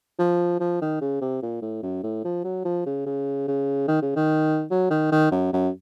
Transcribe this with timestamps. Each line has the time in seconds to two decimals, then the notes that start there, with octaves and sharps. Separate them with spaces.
0.19 F3
0.60 F3
0.81 D#3
1.01 C#3
1.21 C3
1.42 A#2
1.62 A2
1.83 F#2
2.03 A2
2.25 F3
2.44 F#3
2.65 F3
2.86 C#3
3.06 C#3
3.48 C#3
3.88 D#3
4.02 C#3
4.16 D#3
4.71 F#3
4.91 D#3
5.12 D#3
5.31 F#2
5.53 F#2